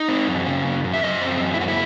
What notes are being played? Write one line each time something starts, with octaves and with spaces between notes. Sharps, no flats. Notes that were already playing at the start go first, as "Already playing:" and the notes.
Already playing: D#4
C4
F#2
C#3
F#2
F#2
E5
F#2 D#5
C4
F#2
E4
F#2 F#4
E4